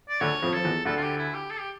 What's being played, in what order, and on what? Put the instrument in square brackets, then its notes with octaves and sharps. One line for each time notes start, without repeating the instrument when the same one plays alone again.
[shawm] D5
[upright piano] D2 D3 [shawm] C#5
[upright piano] F2 F3
[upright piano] F3 [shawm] A4
[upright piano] E2 E3
[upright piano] D2 D3 [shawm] A4
[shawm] F4
G4
E4
G4
A4
G4